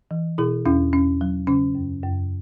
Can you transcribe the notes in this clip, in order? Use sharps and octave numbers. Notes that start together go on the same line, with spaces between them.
E3
B2 E4 G#4
E2 C#4 E4
E2 C#4
F#3
C#3 C#4
F#2
F#2